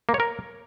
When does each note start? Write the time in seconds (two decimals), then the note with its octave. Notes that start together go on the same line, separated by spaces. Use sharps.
0.09 A#3
0.14 C#5
0.20 A#4